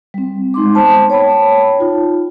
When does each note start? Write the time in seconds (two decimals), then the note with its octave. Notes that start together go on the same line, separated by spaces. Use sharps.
0.14 G3 C4
0.54 G#3 D#4 C6 D6
0.75 B3 C5 A5
1.10 C#5 G5 A5 B5
1.79 D#4 F4